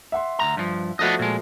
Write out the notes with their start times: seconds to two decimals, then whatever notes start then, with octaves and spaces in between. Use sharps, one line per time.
0.12 E5 F#5 C6
0.39 D2 G#2 A#5
0.57 G2 F3
0.99 F3 A3 B3 D4 F#4 D#5
1.19 A#2 G#3